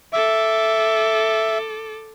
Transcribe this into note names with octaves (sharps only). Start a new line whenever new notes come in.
A4 E5 D6